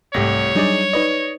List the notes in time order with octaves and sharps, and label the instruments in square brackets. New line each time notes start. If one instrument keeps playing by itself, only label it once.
[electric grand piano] C2 A3 G4 [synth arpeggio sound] G#2 A#6 [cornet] C#5
[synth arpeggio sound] F#3 G3 D4 [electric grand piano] D#4 G#4 D5
[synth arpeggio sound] D#4 B4 D5 [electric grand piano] D#5